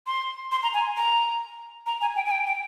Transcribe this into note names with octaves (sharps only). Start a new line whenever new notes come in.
C6
C6
A#5
G#5
A#5
A#5
G#5
G5
G#5
G5
G5